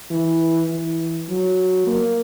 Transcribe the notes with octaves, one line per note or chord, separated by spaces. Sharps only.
E3
E3
F#3
A#3